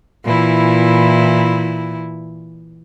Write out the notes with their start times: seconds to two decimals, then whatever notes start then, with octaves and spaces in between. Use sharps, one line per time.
0.24 A#2 E3 E4